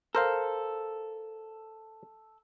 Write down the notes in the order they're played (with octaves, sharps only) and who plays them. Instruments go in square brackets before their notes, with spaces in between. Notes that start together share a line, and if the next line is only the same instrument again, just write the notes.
[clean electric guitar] A4 [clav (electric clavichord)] A#4 C5 F5